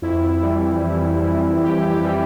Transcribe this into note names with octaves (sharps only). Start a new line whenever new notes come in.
F2 E4
E3 G3
F2
E3 G3
F2 G4
G4
E3 G3